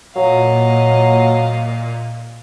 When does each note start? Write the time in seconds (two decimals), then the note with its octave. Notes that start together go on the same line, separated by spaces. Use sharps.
0.16 A#2 F#3 D#5 F5